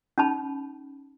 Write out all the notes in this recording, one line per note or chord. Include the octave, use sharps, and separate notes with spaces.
C#4 D#4 A5 B5